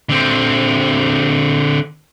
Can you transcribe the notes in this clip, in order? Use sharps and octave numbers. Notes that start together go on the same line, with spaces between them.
D3 C4